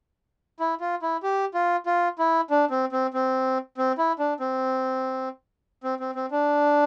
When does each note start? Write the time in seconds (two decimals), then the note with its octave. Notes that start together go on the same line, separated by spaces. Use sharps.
0.60 E4
0.80 F4
1.02 E4
1.23 G4
1.54 F4
1.86 F4
2.19 E4
2.50 D4
2.71 C4
2.92 C4
3.14 C4
3.78 C4
3.98 E4
4.19 D4
4.40 C4
5.84 C4
6.00 C4
6.15 C4
6.31 D4